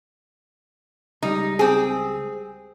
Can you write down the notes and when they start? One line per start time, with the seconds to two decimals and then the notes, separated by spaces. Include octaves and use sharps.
1.23 C#2 G3 D#4
1.59 C4 G#4